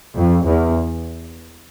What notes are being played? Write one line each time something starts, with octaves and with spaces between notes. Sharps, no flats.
F2
E2